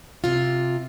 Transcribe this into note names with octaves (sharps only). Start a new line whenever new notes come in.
C3 F4